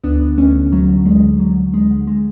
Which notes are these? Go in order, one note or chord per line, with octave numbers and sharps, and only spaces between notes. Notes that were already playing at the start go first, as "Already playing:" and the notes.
D2 B3 D4
D3
D2 A3 C#4
D3
D2 F#3 A3
D3
D2 G#3
D3
D2 F#3
D3
D2 G#3
D3
G#3